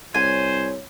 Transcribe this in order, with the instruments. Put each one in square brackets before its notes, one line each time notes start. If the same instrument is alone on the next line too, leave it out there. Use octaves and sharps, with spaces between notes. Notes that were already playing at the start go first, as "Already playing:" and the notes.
[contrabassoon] C2 [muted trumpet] C5 [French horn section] C#5 [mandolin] G#5